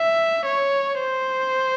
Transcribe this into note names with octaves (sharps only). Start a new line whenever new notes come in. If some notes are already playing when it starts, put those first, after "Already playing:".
Already playing: E5
C#5
C5